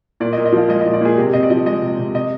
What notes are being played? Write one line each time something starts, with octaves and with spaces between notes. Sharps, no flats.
A#2 D5
D#5
A#2
D#5
F3 F5
G#3 D#5
A#2 D#5
D5
A#2 G#4
C3 G4
C3 D#5
D5
F3 D#5
G#3 D#5
C3
C3
C3 D#5